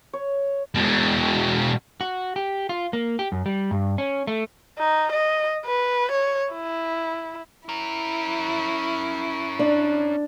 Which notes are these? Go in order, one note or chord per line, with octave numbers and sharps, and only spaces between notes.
C#5
B2 G#3
F#4
G4
F4
A#3
G4
F#2
G3
G2
C#4
A3
D#4
D#5
B4
C#5
E4
C#4 E4 A#4
D4